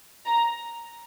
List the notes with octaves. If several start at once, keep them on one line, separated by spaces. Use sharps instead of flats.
A#5